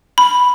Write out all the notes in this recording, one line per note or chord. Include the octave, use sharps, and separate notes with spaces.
B5